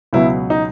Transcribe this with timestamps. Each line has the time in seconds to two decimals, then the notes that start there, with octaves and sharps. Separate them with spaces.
0.13 C#2 B2 F#3 B3 E4
0.50 D#4